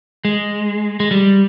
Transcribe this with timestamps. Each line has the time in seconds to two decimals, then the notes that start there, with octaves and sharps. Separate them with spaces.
0.25 G#3
1.00 G#3
1.11 G3